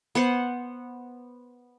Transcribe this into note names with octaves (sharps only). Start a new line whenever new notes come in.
B3 C5 F#5